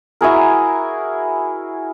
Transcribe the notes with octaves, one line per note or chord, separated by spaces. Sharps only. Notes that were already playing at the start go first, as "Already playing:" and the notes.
E4 F#4 G#4 A#4